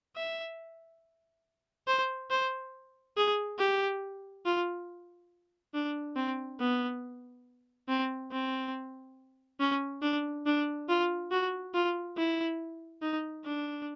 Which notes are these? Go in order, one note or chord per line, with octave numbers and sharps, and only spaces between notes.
E5
C5
C5
G#4
G4
F4
D4
C4
B3
C4
C4
C#4
D4
D4
F4
F#4
F4
E4
D#4
D4